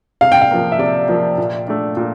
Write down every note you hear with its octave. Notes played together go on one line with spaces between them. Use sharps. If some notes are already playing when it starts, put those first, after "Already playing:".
C3 F5
G5
F5
F3 A#3
E5
C3 D5
F3 A#3
A#2
A3 D4
A#2